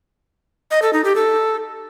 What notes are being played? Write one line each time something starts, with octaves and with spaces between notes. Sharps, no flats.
D#5
A4
D#4
G4
A4